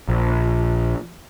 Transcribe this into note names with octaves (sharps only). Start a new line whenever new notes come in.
A#1